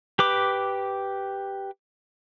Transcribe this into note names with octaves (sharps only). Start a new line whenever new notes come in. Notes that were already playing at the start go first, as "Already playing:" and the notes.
G4 B4 D6